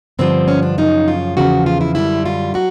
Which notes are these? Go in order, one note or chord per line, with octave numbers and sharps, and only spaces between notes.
G2 D3 F3 C4
C#4
D4
F#2 C#3 F3 D#4
F4
E2 C#3 F3 F#4
F4
E4
F#2 D3 G3 E4
F4
F#3 F#4